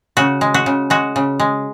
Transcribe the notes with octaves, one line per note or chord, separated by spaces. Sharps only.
C#3 F#4
G#3
F#4
C#3
G#3 F#4
C#3
G#3